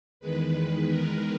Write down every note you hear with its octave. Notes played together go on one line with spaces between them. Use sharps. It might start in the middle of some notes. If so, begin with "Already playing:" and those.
E2 D#3 G#3 B4
A#4